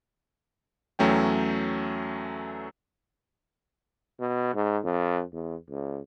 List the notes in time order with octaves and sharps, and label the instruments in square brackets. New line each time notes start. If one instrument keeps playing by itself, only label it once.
[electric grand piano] E2 F#3 A3 C#4 G5
[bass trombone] B2
G#2
F2
E2
C#2